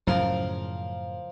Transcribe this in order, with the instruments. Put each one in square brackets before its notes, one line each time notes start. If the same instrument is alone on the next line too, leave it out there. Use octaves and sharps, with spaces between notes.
[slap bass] F#2 A2 C#3 [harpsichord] F3 A#4 C6